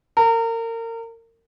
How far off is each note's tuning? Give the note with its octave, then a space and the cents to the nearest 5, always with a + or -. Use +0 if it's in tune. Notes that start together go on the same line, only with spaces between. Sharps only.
A#4 -30